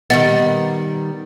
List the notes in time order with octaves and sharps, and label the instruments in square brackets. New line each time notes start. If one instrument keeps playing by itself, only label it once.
[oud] D#3 G3 B3 [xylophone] D#5 F#5 A6